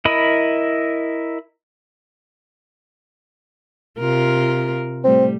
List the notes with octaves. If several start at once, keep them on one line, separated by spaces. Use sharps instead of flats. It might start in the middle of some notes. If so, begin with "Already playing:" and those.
E4 A#4 D#5 B5
C3 F4 A#4
A2 G3 A3 C4